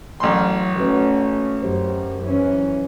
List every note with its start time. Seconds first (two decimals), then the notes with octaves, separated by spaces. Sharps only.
0.20 A1 E3 F#3 C6
0.78 A3 C#4 F#4 B4
1.63 F#2 F#3 G4 C5
2.24 E3 C#4